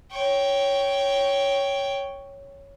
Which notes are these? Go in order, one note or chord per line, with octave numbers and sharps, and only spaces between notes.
C#5 G5